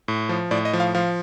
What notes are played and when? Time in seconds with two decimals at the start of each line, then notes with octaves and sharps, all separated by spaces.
0.08 A2
0.29 F3
0.51 A2 D5
0.65 D#5
0.73 F3
0.80 F5
0.95 F3 F5